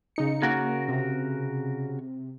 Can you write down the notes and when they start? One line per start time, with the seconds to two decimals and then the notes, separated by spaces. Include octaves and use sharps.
0.16 C#3 D#4 C#7
0.42 C#3 A#3 F#4 A#4
0.88 C3